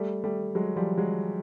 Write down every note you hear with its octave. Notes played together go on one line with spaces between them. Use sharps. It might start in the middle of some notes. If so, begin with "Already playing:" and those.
Already playing: G3 A3
G3 A3
F#3 G#3
F3 G3
F#3 G#3